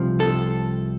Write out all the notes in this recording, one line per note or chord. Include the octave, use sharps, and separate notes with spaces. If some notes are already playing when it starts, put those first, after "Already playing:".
Already playing: C2 C3 F3
A4